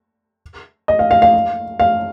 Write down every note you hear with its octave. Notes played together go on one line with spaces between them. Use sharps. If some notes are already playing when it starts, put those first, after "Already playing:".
D#5
F5
F5
F5
F5